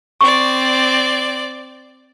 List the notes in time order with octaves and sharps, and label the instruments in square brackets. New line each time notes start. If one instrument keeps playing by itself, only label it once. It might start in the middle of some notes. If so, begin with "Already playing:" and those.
[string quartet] C4 D5 [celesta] C#6